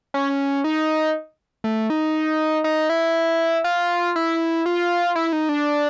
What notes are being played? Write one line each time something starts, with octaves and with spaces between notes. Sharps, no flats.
C#4
D#4
A3
D#4
D#4
E4
F4
E4
F4
E4
D#4
D4